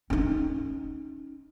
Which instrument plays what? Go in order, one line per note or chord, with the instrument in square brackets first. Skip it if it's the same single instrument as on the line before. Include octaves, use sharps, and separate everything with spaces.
[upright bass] C#4 D#4